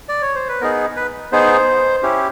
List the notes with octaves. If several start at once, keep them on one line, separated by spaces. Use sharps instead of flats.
D5
C#5
C5
B4
B3 D#4 G#4 A#4
B4
B3 D#4 G#4 C5
C#4 E4 G4